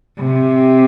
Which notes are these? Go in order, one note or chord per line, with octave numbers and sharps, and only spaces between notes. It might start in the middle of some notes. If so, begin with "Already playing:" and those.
C3